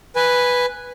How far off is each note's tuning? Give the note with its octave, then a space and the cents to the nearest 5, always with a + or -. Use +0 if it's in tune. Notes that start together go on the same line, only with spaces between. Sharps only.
B4 +0 G#5 -10